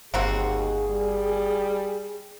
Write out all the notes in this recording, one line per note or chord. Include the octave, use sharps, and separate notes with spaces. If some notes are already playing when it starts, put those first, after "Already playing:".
G1 D#2 A#3 C4 F#4 G#4
G3